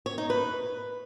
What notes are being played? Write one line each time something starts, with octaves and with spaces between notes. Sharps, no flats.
C#5
D#4
B4